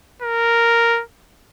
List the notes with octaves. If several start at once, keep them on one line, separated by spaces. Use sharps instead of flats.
A#4